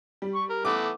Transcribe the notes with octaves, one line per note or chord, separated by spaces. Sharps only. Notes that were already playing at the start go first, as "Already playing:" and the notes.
G3
C#6
A#4
E3 A3 B3 D6